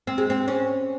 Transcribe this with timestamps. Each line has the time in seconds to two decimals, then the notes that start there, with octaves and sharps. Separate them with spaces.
0.07 C4
0.18 G#3
0.30 C4
0.48 C#4